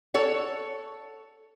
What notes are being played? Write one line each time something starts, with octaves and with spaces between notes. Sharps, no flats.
A4 C#5 F#5